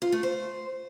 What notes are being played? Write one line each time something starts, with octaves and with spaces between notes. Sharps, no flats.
F4
A3
C5